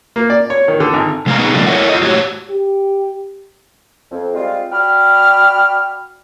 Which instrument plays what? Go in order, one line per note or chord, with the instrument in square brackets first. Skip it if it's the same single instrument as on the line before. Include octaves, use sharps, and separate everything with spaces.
[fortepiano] A#3
D5
C#5
D#3
D3
G#1
[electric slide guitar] C3 G#3 A3 B3 F5 A#5
B2 B3 D#4 G#4
C#3 F3 G3 A3 A#3 D4
E4 A4 A#4 C#5 E5 F#5
F4 D#5
A2 F#4 G4 C#5
[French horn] G4
[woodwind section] F2
G3 G#3 C4 F4
F#4 D5 G5 B5 F6